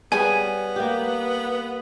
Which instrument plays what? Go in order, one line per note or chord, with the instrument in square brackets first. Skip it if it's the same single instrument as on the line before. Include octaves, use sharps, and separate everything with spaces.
[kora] G3 G#4 C#5 [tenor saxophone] B3 [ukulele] G#5
[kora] A#3 G4